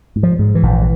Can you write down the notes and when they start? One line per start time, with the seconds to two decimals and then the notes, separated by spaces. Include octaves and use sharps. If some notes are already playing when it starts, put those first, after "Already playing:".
0.16 G#2
0.23 F3
0.39 G#2
0.55 E3
0.63 A#1